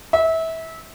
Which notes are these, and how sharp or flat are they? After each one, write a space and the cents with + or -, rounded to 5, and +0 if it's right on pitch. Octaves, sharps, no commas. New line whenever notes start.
E5 -25